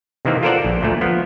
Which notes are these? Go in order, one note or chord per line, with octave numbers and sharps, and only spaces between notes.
C3 D#3 E3 A#3 C4
F4 A4 A#4 C5 D5 F#5
A#1
D2 A#2 A3
F3 B3